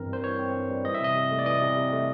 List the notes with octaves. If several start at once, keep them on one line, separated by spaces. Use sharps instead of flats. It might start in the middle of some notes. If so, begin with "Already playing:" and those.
Already playing: G2 E3 C4 A#4
G3 C5
E3 C#5
C4
G2
G3
E3 D#5
E5
C3 D#5
C3
A3
D5
E3 D#5
C3
C3
A3